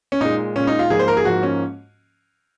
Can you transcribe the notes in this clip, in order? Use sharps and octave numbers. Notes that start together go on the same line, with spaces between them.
C#4
A#2 G#3 D#4
A#2 G#3 C#4
D#4
F4
G#2 F3 A#3 G#4
C5
A#4
G#4
G#2 F3 A#3 F#4
C#4